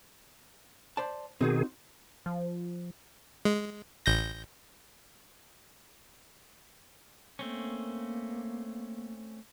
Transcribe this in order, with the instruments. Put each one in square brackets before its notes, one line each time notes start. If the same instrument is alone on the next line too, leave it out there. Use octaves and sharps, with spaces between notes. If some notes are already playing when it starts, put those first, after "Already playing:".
[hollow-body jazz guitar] C5 D5 A5
[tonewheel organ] B2 D#3 G#4 [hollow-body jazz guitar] C4 D#4 F#4
[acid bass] F3
[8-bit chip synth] G#3
A1 G6 A#6
[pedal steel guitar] A3 C4 C#4 [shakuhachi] A#3